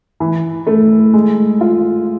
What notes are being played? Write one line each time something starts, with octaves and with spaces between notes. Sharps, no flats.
E3
A3
G#3
F4